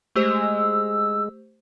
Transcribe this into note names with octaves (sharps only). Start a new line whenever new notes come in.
G#3 A3 G4 C5 E6